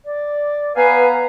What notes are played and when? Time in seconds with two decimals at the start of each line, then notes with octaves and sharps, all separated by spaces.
0.05 D5
0.76 B3 B4 F5 G#5 A#5